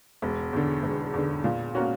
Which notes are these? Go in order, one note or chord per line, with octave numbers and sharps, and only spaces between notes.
E1
E2 D3
E1
E2 D3
A#2
A#3 C#4 F#4